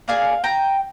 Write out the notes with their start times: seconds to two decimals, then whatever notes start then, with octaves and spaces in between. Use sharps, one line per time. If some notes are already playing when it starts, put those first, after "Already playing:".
0.08 A#3 D4 G#4 F5 G#5
0.44 G5 A#5